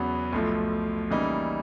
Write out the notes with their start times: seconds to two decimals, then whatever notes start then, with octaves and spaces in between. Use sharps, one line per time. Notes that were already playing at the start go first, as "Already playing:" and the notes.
Already playing: E2 C#3 F#3 B3
0.33 B1 A2 F3 A3
1.10 C#3 E3 G3 A#3 D#4